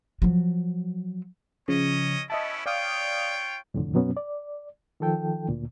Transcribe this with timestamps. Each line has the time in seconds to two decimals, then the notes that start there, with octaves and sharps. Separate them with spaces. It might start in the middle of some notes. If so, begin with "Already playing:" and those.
0.22 F3 F#3
1.68 C#3 F3 C#4 C#5 D#5
2.30 B3 C#4 E4 D#5 E5 A5
2.66 F4 C#5 D5 F5 G5 D#6
3.74 C2 F2 A2 D3
3.94 F#2 B2 F#3 B3 C#4
4.17 D5
5.00 D#3 F3 A4 G5
5.48 D2 A#2